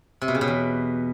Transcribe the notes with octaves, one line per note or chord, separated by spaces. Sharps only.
C3
B2
C#3
B2
E2